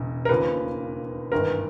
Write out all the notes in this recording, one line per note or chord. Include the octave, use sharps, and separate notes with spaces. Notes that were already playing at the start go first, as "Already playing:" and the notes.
Already playing: E1 E2 C#3
A#4
E1 D#2 C#3 F3 A#3 B4
G#1 G2 E3 A#4